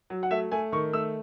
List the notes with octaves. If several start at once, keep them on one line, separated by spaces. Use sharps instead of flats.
F#3
F#5
A3 E5
A3 G#5
D#3 C#6
A3 E6